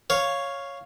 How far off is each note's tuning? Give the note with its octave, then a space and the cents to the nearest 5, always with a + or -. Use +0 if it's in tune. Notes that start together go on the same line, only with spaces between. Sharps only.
C#5 +0 F5 +0